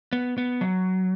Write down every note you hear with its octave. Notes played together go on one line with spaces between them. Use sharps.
B3
B3
F#3